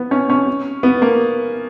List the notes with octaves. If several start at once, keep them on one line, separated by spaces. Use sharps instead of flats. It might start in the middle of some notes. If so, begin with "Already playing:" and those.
Already playing: B3
C#4
C#4
B3
A#3